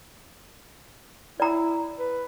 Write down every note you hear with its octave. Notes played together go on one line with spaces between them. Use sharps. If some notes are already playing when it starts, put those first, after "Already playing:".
E4 D5 A#5
B4